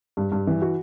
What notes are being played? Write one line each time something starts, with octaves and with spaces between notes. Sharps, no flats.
G2
G2
E3
F#4